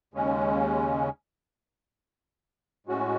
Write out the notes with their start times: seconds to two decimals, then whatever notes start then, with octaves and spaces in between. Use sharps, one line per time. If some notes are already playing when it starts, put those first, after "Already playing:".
0.14 D#2 C#3 G#3 C#4
2.87 A2 G#3 C#4 F#4